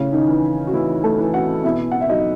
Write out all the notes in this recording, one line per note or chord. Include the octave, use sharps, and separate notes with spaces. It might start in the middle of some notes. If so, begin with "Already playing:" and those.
Already playing: A2 C#3 C#4
D#3 D#4
E3
F#4
A2 E3 E4
A3 A4
E3
F#4 F#5
B2 E4 E5
F#5
E5
F#3 D#4 D#5